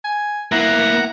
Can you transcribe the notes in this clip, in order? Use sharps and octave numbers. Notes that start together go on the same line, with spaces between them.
G#5
A#3 B3 E4 F#5 A#5